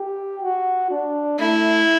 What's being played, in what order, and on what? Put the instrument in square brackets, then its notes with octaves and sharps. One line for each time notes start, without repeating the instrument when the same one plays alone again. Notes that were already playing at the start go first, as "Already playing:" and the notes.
Already playing: [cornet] G4
F#4
D4
[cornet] A3 [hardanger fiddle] E4